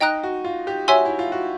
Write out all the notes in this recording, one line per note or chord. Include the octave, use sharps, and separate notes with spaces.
D#4 D#5 G5 A#5 D#6 F#6
F#4
F4
G4
F#4 C#5 E5 G#5 C6 E6
E4
F4
F#4